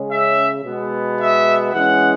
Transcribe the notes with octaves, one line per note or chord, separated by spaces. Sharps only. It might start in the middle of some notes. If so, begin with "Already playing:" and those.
Already playing: C#3 G#3 C#4
E5
B2 G#3 B3
E5
E3 G#3 C#4 F#5